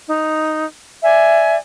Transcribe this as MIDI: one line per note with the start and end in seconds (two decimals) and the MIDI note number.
0.07 0.65 63
1.04 1.57 74
1.04 1.57 76
1.04 1.57 80